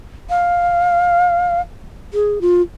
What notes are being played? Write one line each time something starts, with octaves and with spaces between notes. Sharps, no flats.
F5
G#4
F4